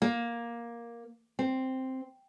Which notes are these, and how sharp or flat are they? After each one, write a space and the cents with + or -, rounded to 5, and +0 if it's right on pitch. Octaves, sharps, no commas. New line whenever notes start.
A#3 +10
C4 +0